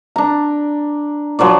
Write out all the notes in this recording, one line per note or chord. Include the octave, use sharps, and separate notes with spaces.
D4 A#5
F3 F#3 C5 D5